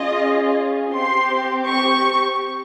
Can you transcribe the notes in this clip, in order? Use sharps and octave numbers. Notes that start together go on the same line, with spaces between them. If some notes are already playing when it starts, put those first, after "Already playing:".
Already playing: C#4 F4 G#4 D#5
C4 G4 C6
C#6